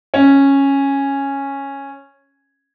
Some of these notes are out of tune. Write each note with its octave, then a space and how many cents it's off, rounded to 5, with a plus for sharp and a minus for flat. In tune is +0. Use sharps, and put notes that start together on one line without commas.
C#4 -10